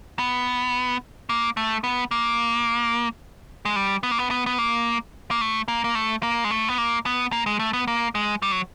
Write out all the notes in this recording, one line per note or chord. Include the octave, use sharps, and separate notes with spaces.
B3
A#3
A3
B3
A#3
G#3
G3
B3
A#3
B3
B3
B3
A#3
A#3
A3
A#3
A#3
A3
A#3
G#3
A3
B3
A#3
B3
A#3
G#3
A3
B3
A#3
G#3
G3
F#3